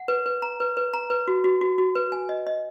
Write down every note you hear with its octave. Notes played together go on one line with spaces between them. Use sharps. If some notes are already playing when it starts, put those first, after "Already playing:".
Already playing: F#5
B4
B4
A#5
B4
B4
A#5
B4
F#4
F#4
F#4
F#4
B4
G#5
D#5
D#5